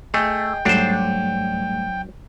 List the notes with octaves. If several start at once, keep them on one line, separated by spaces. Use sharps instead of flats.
A3 G#4 D#5 G5
G#2 F#3 G3 A3 D4 C5